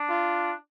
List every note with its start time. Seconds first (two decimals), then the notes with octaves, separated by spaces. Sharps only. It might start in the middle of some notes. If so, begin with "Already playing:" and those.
Already playing: D4
0.09 F4